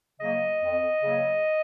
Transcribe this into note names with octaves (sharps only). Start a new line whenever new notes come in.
C#3 F#3 A#3 D#5
F2
C#3 F#3 A#3